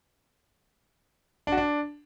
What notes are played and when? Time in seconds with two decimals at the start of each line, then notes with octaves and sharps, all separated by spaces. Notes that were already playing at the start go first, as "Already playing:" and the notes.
1.47 D4
1.52 F#4
1.57 D4